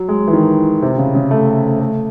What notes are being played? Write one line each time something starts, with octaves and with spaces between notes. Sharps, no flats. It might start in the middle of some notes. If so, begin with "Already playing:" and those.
Already playing: F#3
G#3
E3
D#3
C3
C#3
C#3
A3
A3